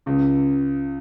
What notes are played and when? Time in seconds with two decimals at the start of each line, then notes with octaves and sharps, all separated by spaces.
0.06 C#2 C#3